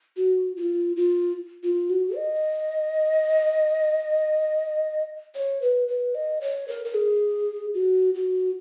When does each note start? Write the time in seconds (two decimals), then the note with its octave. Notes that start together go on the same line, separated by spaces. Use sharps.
0.17 F#4
0.57 F4
0.96 F4
1.63 F4
1.90 F#4
2.16 D#5
5.35 C#5
5.62 B4
5.88 B4
6.15 D#5
6.41 C#5
6.68 A#4
6.84 A#4
6.94 G#4
7.74 F#4
8.15 F#4